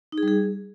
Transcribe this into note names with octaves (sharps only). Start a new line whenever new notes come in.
D#4
G#4
G3
G#4